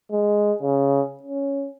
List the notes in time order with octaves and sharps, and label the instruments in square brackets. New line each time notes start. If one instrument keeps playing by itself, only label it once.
[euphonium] G#3
C#3
C#4